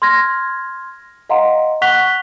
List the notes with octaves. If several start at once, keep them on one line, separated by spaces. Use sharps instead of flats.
C6 F6 G#6 A#6
D#5 F5 F#5 A#5 C6
F#5 C#6 F#6 B6 F7 G7